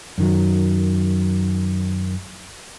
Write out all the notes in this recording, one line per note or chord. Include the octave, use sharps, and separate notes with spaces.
F#2 D#3 F#3